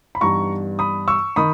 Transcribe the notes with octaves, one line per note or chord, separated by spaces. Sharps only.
B5
G2 E3 G3 B3 D#4 A#5 C#6
B5 D#6
C#6 E6
D#3 B5 D#6